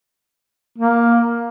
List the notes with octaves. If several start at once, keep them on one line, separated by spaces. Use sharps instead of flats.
A#3